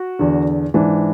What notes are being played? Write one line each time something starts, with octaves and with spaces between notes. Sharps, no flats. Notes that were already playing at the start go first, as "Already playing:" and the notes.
Already playing: F#4
E2 D3
G#2 E3 D4